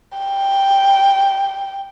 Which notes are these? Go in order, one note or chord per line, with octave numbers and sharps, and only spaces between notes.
G5